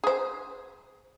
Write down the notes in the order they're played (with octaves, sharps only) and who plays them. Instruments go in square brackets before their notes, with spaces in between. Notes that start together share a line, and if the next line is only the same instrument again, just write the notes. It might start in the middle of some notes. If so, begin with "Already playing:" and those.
[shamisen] G#4 C5